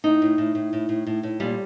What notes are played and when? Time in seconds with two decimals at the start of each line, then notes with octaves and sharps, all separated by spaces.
0.04 A2 D#4
0.22 A2
0.38 A2
0.55 A2
0.73 A2
0.89 A2
1.07 A2
1.23 A2
1.40 A#2 G3